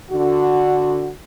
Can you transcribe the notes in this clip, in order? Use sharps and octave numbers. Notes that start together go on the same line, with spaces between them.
D3 F#4